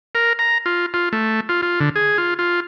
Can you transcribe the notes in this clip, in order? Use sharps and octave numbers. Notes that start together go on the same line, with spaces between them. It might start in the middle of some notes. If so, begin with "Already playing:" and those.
A#4
A#5
F4
F4
A3
F4
F4
D3
G#4
F4
F4